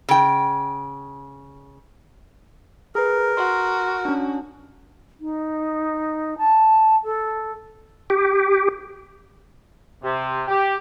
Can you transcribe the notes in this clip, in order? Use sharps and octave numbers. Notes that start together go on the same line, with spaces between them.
C#3 G5
G#4 A#4 B4
F#4 C6
C#4 D4
D#4
A5
A4
G4
C3
G4